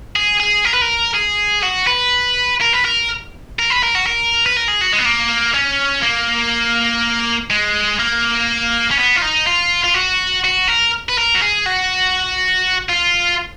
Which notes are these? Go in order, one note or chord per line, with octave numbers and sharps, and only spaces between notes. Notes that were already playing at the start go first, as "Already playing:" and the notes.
G#4
G#4
A#4
B4
A#4
G#4
F#4
B4
A#4
B4
A#4
A#4
B4
A#4
F#4
A#4
B4
A#4
G#4
F#4
G#3
B3
A#3
C#4
A#3
G#3
A#3
C#4
B3
F4
D#4
F4
F4
F#4
F#4
A#4
B4
A#4
F#4
G#4
F#4
F4